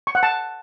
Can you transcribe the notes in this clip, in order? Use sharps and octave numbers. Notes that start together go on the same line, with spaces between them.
C#6
F#5
A5